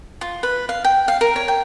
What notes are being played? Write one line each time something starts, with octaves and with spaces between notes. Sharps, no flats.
F4
B4
F5
G5
F5
A#4
C#5
G5